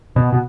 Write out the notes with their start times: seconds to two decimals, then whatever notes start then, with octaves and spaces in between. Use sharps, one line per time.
0.16 B2
0.32 B2